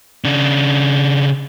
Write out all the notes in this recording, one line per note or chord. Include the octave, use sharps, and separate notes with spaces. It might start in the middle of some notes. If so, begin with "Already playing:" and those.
C#3 D4